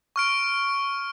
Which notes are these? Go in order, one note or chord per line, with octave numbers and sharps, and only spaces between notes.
C#6 F6 D7